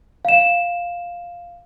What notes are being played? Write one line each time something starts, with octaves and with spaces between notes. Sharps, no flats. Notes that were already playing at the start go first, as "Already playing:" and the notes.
F5 E7